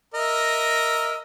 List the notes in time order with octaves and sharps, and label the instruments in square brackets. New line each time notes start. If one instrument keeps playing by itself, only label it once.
[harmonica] A#4 D#5 E5